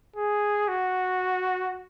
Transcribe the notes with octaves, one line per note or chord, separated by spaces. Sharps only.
G#4
F#4